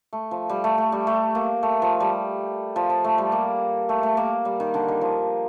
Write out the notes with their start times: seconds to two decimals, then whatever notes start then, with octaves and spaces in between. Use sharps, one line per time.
0.13 A3
0.31 F3
0.49 G3
0.64 A3
0.78 A3
0.92 G3
1.07 A3
1.35 A#3
1.63 A3
1.82 F3
2.00 G3
2.76 F3
2.90 F3
3.04 A3
3.18 G3
3.32 A#3
3.89 A3
4.03 A3
4.17 A#3
4.45 G3
4.60 D#3
4.74 D3
4.88 D#3
5.01 F3